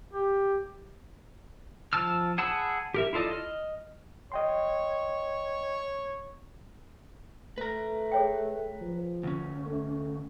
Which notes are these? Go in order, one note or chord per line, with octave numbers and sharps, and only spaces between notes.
G4
F3 A5 E6 F6
G#4 F#5 A5 B5 E6
G4 A#4 E5
E4 F4 A4 D5 D#5
D#5 F6
C#5 D#5 G5 C6
A3 B4 A#5
G#4 C#5 G5
F3
D2 C#4
A3